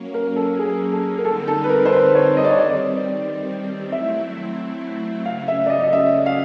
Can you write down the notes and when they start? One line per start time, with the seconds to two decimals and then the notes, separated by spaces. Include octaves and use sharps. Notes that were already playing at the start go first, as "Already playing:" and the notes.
Already playing: F#3 A#3 C#4
0.14 A#4
0.36 A4
0.59 G#4
0.93 A4
1.18 A#4
1.25 D3 G3 C4 D#4 A4
1.48 A4
1.64 B4
1.69 A#4
1.85 C5
1.92 B4
2.15 C#5
2.37 D#5
2.44 D5
2.50 C#5
2.58 D#3 G3 C4 D5
3.92 F#3 A3 C4 E4 E5
5.25 C#3 F#3 A3 C#4 F5
5.48 E5
5.66 D5
5.70 D#5
5.83 D#5
5.93 E5
6.26 F5